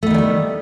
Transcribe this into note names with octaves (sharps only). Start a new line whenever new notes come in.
D#3 G3 A3 B3 D4